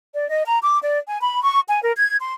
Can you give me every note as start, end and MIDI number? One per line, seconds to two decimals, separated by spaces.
0.14 0.27 74
0.28 0.43 75
0.45 0.59 82
0.62 0.78 86
0.82 0.98 74
1.08 1.20 80
1.20 1.43 83
1.43 1.59 85
1.68 1.82 80
1.82 1.91 70
1.97 2.17 92
2.20 2.34 84